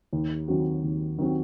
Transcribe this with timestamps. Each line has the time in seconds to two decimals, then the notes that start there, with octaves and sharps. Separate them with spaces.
0.13 D#2
0.48 D#3 F#3 C4 F#4
0.84 D#2
1.18 D#3 F#3 C4 F#4